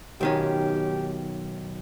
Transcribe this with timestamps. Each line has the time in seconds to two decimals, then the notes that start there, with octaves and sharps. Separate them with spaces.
0.21 B1 D#3 C#4 G4